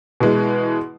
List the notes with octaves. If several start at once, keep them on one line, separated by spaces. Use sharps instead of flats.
B2 E3 G#3